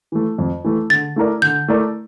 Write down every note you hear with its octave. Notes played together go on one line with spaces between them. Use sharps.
E3 A3
F2
E3 A3
D3 A6
A3 E4 A#4 D5
D3 G6
A3 E4 A#4 D5